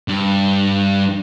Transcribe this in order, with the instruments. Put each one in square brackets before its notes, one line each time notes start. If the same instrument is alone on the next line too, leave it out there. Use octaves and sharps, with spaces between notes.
[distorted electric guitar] G2